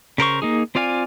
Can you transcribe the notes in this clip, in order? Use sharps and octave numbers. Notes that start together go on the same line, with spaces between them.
C#3 A#4 C5 C#6
A#3 D#4 G#4
C4 F4 D5 F5 G#5